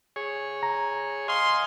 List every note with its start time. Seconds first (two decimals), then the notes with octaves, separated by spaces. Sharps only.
0.16 G#4 C#5
0.63 A#5
1.28 D#5 F5 G#5 C6